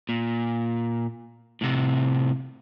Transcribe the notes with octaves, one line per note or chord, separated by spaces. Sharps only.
A#2
A2 C3